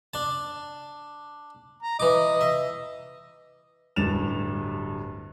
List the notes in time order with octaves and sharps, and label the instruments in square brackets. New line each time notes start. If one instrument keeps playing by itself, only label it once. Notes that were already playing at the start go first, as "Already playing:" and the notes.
[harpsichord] D4 A5
[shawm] A#5
[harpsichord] E3 D6 [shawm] D#5
[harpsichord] E5
[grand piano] D1 G2 A6 E7 F7